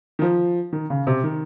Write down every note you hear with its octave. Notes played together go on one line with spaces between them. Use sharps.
D#3
F3
D#3
C#3
C3
D#3